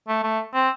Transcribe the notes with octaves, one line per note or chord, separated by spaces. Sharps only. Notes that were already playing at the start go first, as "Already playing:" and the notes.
A3
A3
C4